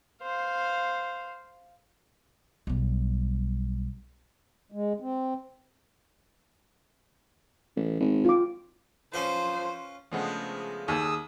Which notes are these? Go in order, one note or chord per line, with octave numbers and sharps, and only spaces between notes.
C5 F5
B1 G3
G#3
C4
A1
G#1
F4 D6
F3 C#4 F4 B4 C5
C#3 F3 G#3 A3 B3 D4
D#2 G#4 D#6 E6